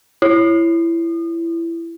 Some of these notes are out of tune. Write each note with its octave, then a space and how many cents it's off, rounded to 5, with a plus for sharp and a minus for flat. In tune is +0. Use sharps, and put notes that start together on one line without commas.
E4 +20